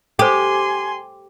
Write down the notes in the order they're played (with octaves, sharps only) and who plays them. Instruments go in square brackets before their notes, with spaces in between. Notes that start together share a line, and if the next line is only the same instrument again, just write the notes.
[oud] G4 [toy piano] A4 C5 [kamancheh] G#5 C6